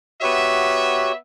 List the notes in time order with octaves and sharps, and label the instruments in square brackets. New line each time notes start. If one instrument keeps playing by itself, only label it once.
[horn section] B3 E5 [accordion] F#4 G4 C#5